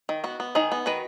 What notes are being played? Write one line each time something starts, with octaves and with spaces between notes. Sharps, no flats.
D#3
B3 F#4
B3
D#3 D#4 G#4
B3
D#3 F#4 B4